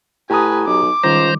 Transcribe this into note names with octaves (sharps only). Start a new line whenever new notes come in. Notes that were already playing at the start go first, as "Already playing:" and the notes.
A2 G4 B4 G#5 A#5 D#6
B1 D6
C#2 D#3 G3 C5 A#5